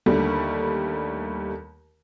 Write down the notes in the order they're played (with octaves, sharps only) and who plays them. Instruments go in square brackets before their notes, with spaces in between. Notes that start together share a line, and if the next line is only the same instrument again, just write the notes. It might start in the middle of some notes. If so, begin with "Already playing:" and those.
[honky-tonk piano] D#2 D3 G3 A3